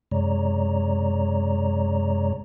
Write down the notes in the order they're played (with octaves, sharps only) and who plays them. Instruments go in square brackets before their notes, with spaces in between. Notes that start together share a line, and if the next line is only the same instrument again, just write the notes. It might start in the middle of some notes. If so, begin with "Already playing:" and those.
[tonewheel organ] F#2 C3 G#3 C#5 D5 A#5